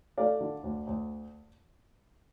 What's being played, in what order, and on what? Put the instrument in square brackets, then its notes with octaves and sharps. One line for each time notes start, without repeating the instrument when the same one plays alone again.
[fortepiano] A3 D5 F5
D3
D2
D2